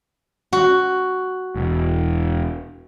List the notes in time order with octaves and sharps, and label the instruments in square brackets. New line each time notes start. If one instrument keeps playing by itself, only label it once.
[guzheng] F#4
[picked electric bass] E1